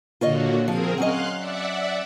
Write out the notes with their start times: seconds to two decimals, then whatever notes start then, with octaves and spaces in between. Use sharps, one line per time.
0.21 A#2 D3 F4 F#4 C#5 D#5
0.68 F3 C4 G#4 A#4
0.98 F#3 C#4 D#5 F5 C6 F#6
1.37 D5 E5 F#5